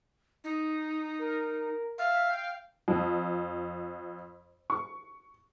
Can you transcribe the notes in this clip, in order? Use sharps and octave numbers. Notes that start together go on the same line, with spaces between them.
D#4
A#4
E5 F5
G5
F2
C#6